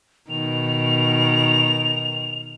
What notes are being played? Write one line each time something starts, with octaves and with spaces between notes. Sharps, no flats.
B2 D#3 F7